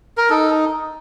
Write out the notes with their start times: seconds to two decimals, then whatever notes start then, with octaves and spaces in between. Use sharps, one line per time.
0.17 A#4
0.30 D#4 A4